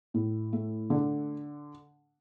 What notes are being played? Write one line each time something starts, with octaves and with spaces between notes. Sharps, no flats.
A2
A3
D3